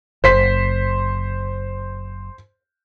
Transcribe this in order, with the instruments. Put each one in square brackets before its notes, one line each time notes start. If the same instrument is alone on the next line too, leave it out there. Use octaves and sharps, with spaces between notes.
[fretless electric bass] F#1 [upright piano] C5 B6